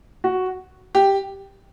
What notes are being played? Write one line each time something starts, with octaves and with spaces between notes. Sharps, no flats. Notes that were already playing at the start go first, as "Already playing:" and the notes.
F#4
G4